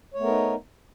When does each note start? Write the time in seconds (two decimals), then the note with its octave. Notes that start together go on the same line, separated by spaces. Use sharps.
0.14 C#5
0.17 A3
0.21 B3
0.24 A#4
0.27 D#4